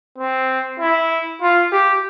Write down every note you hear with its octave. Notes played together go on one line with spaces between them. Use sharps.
C4
E4
F4
G4